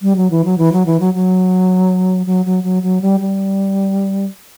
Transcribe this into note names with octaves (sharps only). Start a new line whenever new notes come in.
G3
F#3
E3
F#3
E3
F#3
E3
F#3
F#3
F#3
F#3
F#3
F#3
G3
G3